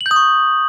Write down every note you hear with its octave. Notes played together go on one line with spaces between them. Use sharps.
F#7
G6
D#6
C#6